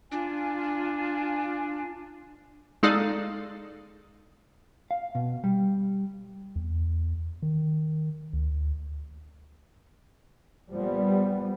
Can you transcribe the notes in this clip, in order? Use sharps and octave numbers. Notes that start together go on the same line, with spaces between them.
D4 F4 G#5
G#3 D#4 G#4 A4 D5 F5
F5
B2
G3
E2
D#3
D2
A#2 F3 G3 B3